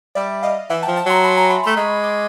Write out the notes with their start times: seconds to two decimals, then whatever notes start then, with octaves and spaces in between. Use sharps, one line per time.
0.15 G3 D5 E5
0.43 D#5 F5
0.70 E3 E5 F#5
0.82 G5 A5
0.88 F3
0.96 G5 A5
1.06 F#3 A#5 C6
1.24 A5 B5
1.37 G#5 A#5
1.50 A5 B5
1.63 A3 A#5 C6
1.77 G#3 B5 C#6
2.03 C6 D6